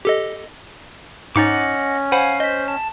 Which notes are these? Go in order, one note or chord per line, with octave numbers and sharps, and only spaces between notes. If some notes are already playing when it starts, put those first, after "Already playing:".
G4 A4 D#5
G#2 C#4 D#4 D#5 F#5 D6 A6
C5 F5 F#5 G#5 B5
C5 D#5 B6
A5